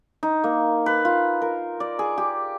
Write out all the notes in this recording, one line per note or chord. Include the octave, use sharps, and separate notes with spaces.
D#4
A#3
B4
F4
A#4
D5
G#4
G4